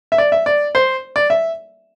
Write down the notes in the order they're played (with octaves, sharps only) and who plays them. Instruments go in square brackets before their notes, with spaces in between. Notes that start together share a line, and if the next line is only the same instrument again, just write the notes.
[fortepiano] E5
D5
E5
D5
C5
D5
E5